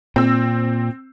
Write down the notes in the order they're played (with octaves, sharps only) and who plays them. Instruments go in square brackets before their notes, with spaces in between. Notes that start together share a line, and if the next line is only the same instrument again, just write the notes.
[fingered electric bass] A#2 [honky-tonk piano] C4 E6